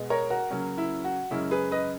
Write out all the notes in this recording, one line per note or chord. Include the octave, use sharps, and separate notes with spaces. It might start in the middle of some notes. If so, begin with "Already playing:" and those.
Already playing: B2 G#3 B3
A#4 C#5
F#4 A#4
C#3 F#3 A#3 C#4
E4
F#4
F#2 C#3 G#3 C#4 E4
G#4 B4
B4 D#5